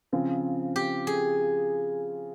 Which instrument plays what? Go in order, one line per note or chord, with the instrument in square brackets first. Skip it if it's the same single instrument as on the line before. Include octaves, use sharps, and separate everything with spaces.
[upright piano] C#3 F3 C4
[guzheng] G4
G#4